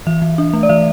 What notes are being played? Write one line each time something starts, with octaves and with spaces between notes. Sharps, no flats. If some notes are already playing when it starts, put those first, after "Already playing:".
E3 E5
E3
D4
A3
D5
E3 E5